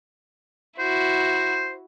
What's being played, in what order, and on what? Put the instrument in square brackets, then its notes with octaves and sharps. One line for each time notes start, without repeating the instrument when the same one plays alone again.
[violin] E4 F#4 [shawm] C5